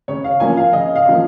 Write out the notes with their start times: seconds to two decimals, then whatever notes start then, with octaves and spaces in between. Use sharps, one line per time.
0.08 C#3 C#5
0.24 F5
0.40 F3 A#3 C#4 G#5
0.57 F5
0.73 C#3 D#5
0.96 F5
1.06 F3 A#3 C#4